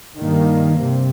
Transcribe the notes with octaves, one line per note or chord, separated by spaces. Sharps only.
G2 D#3 A#3
C3